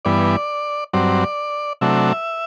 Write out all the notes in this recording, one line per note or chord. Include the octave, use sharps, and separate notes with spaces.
G2 E3 B3 D5
G2 F#3 C4 D5
C3 F#3 A3 D4 E5